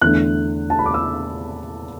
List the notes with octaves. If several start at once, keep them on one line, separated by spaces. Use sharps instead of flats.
E2 D3 A3 F#6
A5
B5
D6
E6